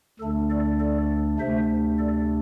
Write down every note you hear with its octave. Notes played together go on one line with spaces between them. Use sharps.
D2 D3 A3 D4 A4
A4 D5
A4 D5
D2 C3 A3 D4 C5 E5
A4 D5